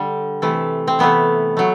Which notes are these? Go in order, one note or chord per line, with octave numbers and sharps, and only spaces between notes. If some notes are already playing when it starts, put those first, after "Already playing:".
Already playing: D3 G3
C3 E3 A3
C4
C3 E3 A3 B3
F#3 A3